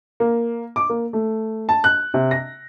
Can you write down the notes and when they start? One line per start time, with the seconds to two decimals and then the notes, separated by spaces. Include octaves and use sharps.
0.20 A#3
0.76 D6
0.89 A#3
1.13 A3
1.69 A5
1.84 F#6
2.14 C3
2.31 A#6